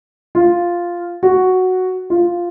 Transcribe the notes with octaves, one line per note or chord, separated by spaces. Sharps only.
F4
F#4
F4